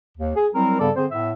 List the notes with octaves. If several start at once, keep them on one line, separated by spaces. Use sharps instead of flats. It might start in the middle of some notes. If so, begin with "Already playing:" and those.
D#2
G#4
F#3 G3 C4 E4 A#4
G2 C#3 G3 B3 A4 D5
D3 C4 G#4 C5
A2 B3 E5